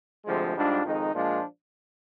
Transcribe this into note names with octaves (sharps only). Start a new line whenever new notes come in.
D2 C3 F3 G#3
G#2 G3 D4 F4
F2 D#3 G#3 D#4
A#2 F3 G#3 D4 F4